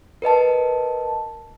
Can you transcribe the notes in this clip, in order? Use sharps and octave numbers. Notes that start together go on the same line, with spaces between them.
A#4 B4 D#5 A5